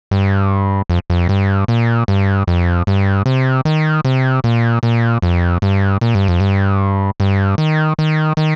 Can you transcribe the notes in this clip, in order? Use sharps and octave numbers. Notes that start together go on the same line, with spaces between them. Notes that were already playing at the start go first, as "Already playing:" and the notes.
G2
F2
F2
G2
A#2
G2
F2
G2
C3
D#3
C3
A#2
A#2
F2
G2
A#2
G2
F2
G2
G2
D#3
D#3
D#3